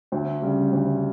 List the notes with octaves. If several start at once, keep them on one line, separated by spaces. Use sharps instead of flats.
D2
C#3 G3
D2